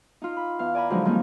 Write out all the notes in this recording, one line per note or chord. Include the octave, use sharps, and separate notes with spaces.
D#4 F4
B5
E2 F5
D5 G#5 A#5 B5
D3 F3 F#3 G#3 D4 D#4
D#3 F3 G3 A#3 C4 D#4